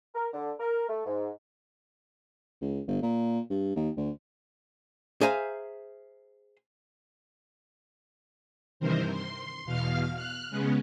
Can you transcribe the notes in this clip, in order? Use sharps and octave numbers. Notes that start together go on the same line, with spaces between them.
A#4
D3
A#4
A3
G#2
C#2
G1
A#2
G2
D#2
D2
G#4 C5 E5 F5 G#5 A#5
G2 C3 D#3 E3 A#4 C5
C6
E2 B2 F5 F6
F6 F#6
C#3 G#3 B3 C#4